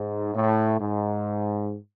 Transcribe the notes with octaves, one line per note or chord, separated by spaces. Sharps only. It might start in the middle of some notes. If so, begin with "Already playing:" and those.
Already playing: G#2
A2
G#2